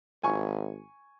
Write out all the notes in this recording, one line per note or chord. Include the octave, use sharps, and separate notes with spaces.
G#1 G#5 C#6